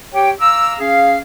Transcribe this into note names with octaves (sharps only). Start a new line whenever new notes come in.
G4 C#5 G5
F5 A#5 D6 E6
C#4 G#4 F5